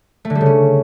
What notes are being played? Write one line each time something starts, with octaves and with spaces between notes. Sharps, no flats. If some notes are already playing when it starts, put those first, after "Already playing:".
A3
D3
G3
C#3
C#4